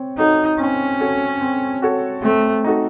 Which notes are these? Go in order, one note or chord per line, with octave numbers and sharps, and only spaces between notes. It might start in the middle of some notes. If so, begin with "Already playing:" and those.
Already playing: C4 C#5
D#4 F#4 A4 C#5
C4 C#4
F#4 A4 C#5
C4
F#4 A4 C#5
A3 C4
D#4 F#4 A4